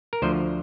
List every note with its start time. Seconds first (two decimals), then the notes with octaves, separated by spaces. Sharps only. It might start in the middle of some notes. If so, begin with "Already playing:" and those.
0.13 A#4
0.22 D2 D3 F3 C5